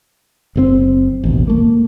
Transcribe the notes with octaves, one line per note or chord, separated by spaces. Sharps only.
F#1 B2 C4
A1 D#2 B2
A3 A#3